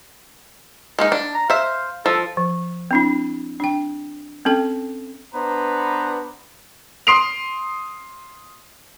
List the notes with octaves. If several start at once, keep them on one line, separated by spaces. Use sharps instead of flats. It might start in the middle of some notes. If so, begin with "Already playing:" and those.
G#3 A#3 D#4
D4
A#5
C5 E5 F5
F3 A4
F3
C4 D4 E4
D4 G5
C4 C#4 A4 G5
B3 D4 B4 C5 A#5
C6 D#6 C7 D7 F7